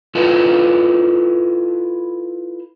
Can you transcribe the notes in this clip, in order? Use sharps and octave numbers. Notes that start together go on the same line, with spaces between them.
E4 F4 A4 B4 D#5